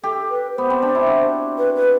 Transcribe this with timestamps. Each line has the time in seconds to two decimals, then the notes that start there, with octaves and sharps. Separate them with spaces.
0.03 G4 A4
0.30 B4
0.55 B3 C5
0.70 C4
0.82 D4
0.95 E4
1.07 F#4
1.58 B4
1.76 B4